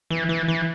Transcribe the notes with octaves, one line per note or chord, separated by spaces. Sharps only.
E3
E3
E3